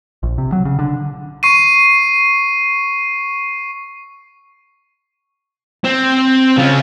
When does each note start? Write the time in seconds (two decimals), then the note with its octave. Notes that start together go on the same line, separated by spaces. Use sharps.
0.23 A#1
0.38 C3
0.52 F#3
0.65 C#3
0.79 D3
1.43 C#6 C7 D#7
5.84 C4
6.57 C#3 F4